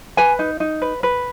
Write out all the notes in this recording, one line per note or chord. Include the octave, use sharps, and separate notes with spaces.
B4 G#5
D#4
D#4
B4
B4